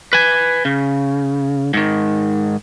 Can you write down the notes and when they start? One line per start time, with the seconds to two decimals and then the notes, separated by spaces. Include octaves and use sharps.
0.13 B4 G#5
0.65 C#3
1.74 G#2 D#3